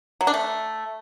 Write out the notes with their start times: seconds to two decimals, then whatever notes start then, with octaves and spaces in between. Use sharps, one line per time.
0.21 F#3
0.27 D4
0.34 A3